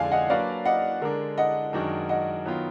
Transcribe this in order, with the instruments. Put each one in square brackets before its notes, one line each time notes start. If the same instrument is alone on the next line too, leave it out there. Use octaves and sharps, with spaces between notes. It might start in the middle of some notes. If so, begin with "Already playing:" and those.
Already playing: [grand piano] F2 D3 G#3 [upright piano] D5 F5 G#5
[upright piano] D#5 F#5
[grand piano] F#3 A#3 D4 F#4 B4 [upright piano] D5 F5
[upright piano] D#5 F#5
[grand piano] D3 G#3 D4 [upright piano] A#4
[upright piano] D#5 F#5
[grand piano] F#2 D#3 G#3 D4 F#4
[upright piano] D#5 F#5
[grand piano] D#3 F#3 B3 F4